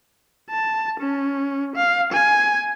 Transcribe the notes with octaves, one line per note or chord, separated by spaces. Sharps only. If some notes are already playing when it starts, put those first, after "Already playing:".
A5
C#4
F5
G#5